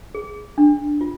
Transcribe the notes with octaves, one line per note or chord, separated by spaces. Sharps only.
G#4
D4
F4